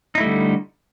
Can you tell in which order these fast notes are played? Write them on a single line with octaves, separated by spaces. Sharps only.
D#4 E4 A3 G3 D3